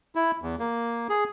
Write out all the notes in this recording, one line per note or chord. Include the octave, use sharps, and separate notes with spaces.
E4
E2
A#3
G#4